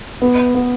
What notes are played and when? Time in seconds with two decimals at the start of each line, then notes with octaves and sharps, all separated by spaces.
0.22 B3
0.55 B3